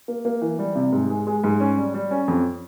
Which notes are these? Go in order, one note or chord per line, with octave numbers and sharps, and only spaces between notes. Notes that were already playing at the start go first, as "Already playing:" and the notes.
A#3
A#3
E3
G3
C3
G#2
G#3
G#3
G#2
C#4
G3
G3
C#4
F2